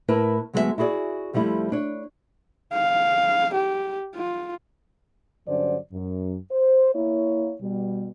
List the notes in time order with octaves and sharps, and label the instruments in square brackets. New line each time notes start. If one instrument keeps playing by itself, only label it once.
[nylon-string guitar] A2 E4 A#4 B4 A5
D2 F#3 G#3 B3 A4 E5
E4 F#4 G#4 B4 D5
F2 F3 G3 A3 E4
D4 C#5
[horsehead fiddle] F5
G4
F4
[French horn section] G2 D3 F#3 C#4 C5 D5
F#2
C5
A#3 E4 C#5
B2 G3